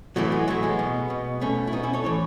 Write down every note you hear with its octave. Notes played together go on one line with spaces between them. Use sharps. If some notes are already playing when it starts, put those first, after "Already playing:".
A2 E3 F#3 A3
G#3 B3
A2 E3 F#3 A3
G#3 B3
B2
B2
B2 A3 C#4
E4
B2 B3 D#4
C#4 E4
A4 C#5
A2 E3 A4 C#5